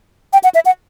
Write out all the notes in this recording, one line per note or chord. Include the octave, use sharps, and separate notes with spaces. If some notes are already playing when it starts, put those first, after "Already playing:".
G5
F#5
E5
F#5